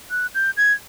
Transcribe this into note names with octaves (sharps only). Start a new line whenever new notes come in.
F#6
G6
G#6